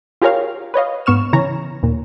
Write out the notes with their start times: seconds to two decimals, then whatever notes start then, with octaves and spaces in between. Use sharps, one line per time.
0.22 F4 G4 G#4 A#4 C#5 F5
0.74 B4 C#5 D#5 F5
1.06 G#2 B3 C#6 F6 E7
1.33 C#3 E3 C#5 A#5
1.83 D#2 A#2